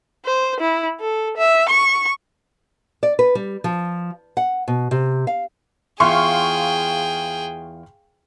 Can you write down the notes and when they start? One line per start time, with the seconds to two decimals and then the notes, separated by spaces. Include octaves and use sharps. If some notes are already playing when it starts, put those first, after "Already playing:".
0.26 C5
0.60 E4
1.00 A4
1.37 E5
1.69 C#6
3.03 D5
3.19 B4
3.35 G3
3.64 F3
4.37 F#5
4.68 B2
4.91 C3
5.27 F5
6.00 E2 F4 G#4 F5 G5 C6 C#6